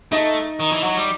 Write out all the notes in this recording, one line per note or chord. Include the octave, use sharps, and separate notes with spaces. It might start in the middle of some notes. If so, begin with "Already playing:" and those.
A3 D#4 D#5
D#3
E3
F#3
G3